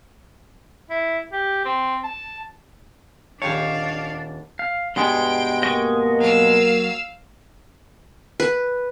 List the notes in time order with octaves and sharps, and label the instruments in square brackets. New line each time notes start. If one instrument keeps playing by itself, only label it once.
[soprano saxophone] E4
G4
C4
A5
[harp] D#1 G4 A5 [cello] D4 [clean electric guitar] C#5 [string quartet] F5
[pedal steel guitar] F5
[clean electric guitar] G2 B2 G#3 [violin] G5 D7 [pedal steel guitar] C6
[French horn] A#3 [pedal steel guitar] D#5 C#6 D#6
[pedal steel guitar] F#3 [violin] F5 E6
[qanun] B4